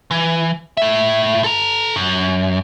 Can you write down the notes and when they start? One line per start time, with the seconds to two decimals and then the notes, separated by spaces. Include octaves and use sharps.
0.11 E3
0.77 A2 E5
1.44 A4 A#5
1.96 F#2